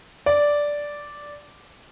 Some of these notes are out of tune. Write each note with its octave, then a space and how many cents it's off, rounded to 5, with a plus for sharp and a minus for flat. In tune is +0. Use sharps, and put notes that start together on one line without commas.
D5 -5